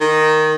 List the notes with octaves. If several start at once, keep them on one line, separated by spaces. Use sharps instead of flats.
D#3